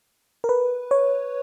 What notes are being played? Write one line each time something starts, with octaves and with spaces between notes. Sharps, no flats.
A#4
B4
C#5